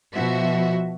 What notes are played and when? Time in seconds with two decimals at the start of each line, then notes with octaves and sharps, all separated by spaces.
0.13 B2 F3 F#4 E5